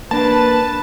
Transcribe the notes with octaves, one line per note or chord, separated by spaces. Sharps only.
A#3 D4 B4 A5